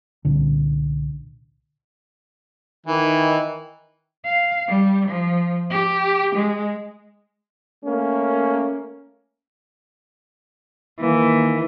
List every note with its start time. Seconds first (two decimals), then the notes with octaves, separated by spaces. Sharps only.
0.25 C2 A#2 D3
2.86 D#3 E3
4.25 F5
4.68 G3
5.09 F3
5.71 G4
6.36 G#3
7.85 A3 A#3 C#4
11.00 D#3 E3 A#3